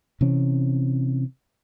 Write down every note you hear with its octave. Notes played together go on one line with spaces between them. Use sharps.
C3 E3 C4 C#4